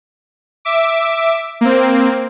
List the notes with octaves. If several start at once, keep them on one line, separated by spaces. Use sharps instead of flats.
E5 D6
A#3 C4